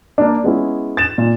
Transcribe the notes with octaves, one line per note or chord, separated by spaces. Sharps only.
A#3 D4
G#3 B3 C#4 E4
A6 E7
A#2